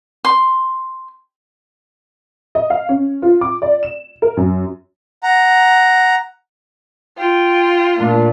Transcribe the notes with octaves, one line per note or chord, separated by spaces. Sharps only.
C6
D#5
F5
C#4
F4
D6
D5
E7
A#4
F#2
F#5 A#5
F4 G5
A#2 A3 A#3 D4